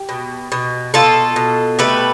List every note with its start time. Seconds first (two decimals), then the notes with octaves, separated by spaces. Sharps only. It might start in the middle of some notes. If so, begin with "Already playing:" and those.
Already playing: G4
0.09 B2
0.52 B2
0.94 B2 F4 A4
1.36 B2
1.79 A3 G4 B4